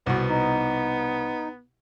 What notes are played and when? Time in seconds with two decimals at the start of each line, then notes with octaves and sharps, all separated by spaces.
0.07 C2 B2 B3
0.29 D#4